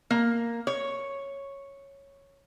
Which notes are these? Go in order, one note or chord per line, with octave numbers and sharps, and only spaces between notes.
A#3
C#5